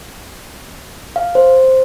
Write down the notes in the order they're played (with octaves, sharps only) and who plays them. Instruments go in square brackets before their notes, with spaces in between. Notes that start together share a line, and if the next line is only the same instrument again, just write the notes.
[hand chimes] F5
C5